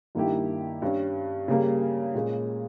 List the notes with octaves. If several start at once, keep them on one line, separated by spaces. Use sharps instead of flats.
G2 D#3 A#3 E4 G4
G2 G3 C#4
C#3 G3 A#3
A#2 G#3 C#4